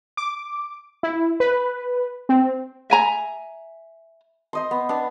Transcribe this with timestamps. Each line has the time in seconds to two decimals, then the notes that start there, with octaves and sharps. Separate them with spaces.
0.17 D6
1.03 E4
1.40 B4
2.29 C4
2.90 E5 G#5 A#5
4.53 C5 D#5 C6
4.71 B3
4.89 B3 D4